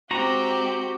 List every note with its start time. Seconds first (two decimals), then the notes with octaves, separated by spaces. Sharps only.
0.11 G#3 C4 F#4 G4 A#5